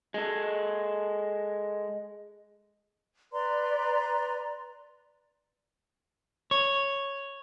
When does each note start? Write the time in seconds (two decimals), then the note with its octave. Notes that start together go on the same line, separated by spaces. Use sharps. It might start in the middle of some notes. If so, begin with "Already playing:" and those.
0.14 G#3 A4
3.33 B4 D5 A#5 C6
6.51 C#5